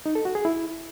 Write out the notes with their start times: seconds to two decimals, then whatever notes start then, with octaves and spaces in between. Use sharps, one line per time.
0.06 D#4
0.15 A4
0.25 F#4
0.35 G#4
0.45 E4